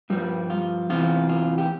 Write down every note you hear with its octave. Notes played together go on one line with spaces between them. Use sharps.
G2 F3 G3
F4
E2 C3 E3 F4
F4
G4